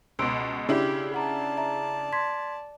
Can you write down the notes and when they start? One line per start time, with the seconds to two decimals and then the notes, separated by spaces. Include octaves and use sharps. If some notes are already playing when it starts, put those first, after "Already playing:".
0.19 C#2 B2 C6 E6 D7
0.69 C#3 D4 E4 G4
1.14 D5 F#5 A5 A#5
1.57 E5 A#5
2.13 C6 G#6 B6